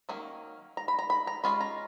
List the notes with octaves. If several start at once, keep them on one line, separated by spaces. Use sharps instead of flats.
D#3 F#3 A#3 C#4
A#5
B5
A#5
B5
A#5
G#3 C#4 F4 B5
A#5